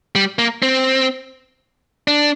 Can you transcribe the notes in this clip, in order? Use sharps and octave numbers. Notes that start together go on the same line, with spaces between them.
G3
A#3
C4
D4